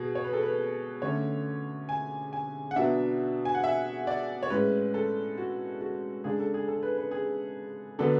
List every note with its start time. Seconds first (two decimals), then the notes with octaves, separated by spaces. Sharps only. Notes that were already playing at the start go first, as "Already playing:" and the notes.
Already playing: B2 G#4
0.15 C#5
0.24 B4
0.33 A4
0.43 B4
1.02 D3 A3 C#4 C#5
1.89 G#5
2.33 G#5
2.71 F#5
2.76 B2 F#3 B3 D4 E5
3.45 G#5
3.55 F#5
3.64 E5
4.07 D5
4.43 C#5
4.50 A2 G#3 C#4 B4
4.94 A4
5.38 F#4
5.81 F#4
6.24 C#3 G#3 D4 G#4
6.40 A4
6.54 G#4
6.68 A4
6.83 B4
6.98 B4
7.11 G#4
7.99 D3 F#3 B3 D4 A4